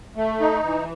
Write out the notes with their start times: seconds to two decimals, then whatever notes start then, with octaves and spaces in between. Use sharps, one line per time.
0.16 A3
0.40 D#4
0.63 E3